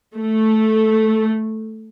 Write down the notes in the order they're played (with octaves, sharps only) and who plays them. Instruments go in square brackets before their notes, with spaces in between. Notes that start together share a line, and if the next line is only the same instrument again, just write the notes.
[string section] A3